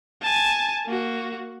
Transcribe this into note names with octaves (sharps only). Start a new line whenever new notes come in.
G#5 A5
A#3 F#4